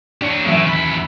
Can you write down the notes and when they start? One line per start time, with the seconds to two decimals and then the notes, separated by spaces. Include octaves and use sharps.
0.22 D4 G4 C#5
0.46 F#2 A2 E3 E5
0.66 D#2 B5